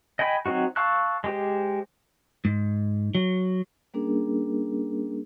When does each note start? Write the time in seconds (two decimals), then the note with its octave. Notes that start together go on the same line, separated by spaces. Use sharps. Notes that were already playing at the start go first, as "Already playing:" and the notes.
0.19 D#5 G5 G#5 B5
0.46 F#3 C4 D#4 F#4
0.76 F5 A5 C#6 E6 F#6
1.24 G#3 G4 C5
2.45 G#2
3.15 F#3
3.94 G3 A#3 C#4 D4 G#4 A#4